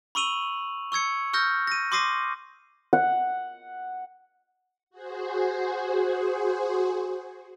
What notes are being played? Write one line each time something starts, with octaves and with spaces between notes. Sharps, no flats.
B5 C#6 E6 D#7 F7 F#7
C#6 E6 G#6 C#7
C#6 E6 F6 G6 A#6
A#6 D#7
C6 D6 D#6 A#6 C7 D#7
F#5
F#4 G#4 C5